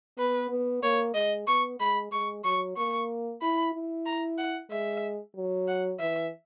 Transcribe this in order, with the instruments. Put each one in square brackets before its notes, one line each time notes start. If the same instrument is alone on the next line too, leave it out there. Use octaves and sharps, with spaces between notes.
[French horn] B3 [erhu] B4
[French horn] B3
[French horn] A#3 [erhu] C#5
[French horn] G#3 [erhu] D#5
[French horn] B3 [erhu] C#6
[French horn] G#3 [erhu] B5
[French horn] G#3 [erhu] C#6
[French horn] F#3 [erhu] C#6
[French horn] A#3 [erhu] C#6
[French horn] E4 [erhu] B5
[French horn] E4
[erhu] A#5
F#5
[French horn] G#3 [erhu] E5
[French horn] F#3
[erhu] F#5
[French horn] E3 [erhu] E5